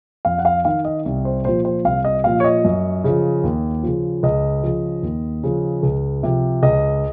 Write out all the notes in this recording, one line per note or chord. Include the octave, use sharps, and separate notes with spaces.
F2 F5
F#5
F5
D#3 F5
D#5
C2
C5
A#2 F3 C5
C5
C2 F5
D#5
A#2 F3 F5
C#5
D#5
F#2
C#3 F3
D#2
C#3 F3
C#2 D#5
C#3 F3
D#2
C#3 F3
C#2
C3 F3
C#2 D#5